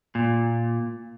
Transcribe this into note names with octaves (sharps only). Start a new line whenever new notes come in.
A#2